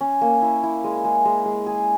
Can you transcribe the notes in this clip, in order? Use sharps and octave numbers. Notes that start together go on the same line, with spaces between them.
C#4
A#3
E4
E4
G#3
G#3
G#3
G#3
G#4